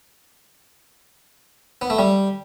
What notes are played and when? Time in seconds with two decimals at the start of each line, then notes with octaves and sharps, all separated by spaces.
1.82 B3
1.90 A3
1.99 G3